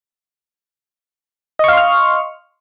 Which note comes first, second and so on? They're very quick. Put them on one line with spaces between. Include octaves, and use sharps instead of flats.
D#5 C#6 F5 C6 F6